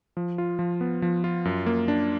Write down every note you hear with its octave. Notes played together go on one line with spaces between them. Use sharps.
F3
F4
F3
B3
F3
F4
F#2
A#3
D4